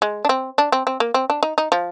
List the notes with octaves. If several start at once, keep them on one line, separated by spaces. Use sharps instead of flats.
G#3
D4
C4
D4
C4
C4
A#3
C4
D4
D#4
D#4
F3